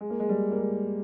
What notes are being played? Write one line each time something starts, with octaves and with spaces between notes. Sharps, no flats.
G#3
A#3
G#3
G3
A#3
G#3